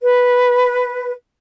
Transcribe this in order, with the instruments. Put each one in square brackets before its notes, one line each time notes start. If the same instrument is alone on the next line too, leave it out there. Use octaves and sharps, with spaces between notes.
[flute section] B4